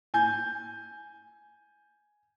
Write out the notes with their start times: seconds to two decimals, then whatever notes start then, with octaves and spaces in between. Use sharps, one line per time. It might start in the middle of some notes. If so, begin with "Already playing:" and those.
0.14 G#5 G6